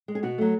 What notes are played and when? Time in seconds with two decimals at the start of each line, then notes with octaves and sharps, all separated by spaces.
0.08 G#3
0.15 G#4
0.23 B2 F#4
0.38 F#3 A3